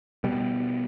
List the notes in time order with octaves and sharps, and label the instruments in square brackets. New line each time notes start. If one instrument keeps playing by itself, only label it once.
[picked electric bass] B2 G3